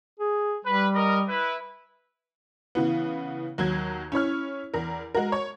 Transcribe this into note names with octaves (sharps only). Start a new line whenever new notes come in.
G#4
G3 B4
A#4 D#5
E4 B4
C#3 E3 B3
D#2 F#3 G#6
C#4 E4 C#5 F6
E2 A#4
G#3 F#4 A#4
C#5